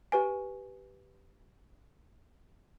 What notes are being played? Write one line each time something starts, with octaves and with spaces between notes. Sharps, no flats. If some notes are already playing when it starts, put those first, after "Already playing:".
G4 B4 G#5